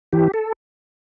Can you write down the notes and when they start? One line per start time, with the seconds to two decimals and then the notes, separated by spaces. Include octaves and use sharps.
0.13 E3 G4
0.34 A4